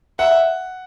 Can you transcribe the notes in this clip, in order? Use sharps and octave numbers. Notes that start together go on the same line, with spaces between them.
E5 F#5